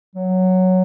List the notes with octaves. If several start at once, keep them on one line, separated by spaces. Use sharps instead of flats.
F#3